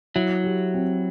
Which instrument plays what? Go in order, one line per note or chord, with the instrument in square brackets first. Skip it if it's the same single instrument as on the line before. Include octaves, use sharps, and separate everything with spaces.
[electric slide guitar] F#3 [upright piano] E4
[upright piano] G4
C4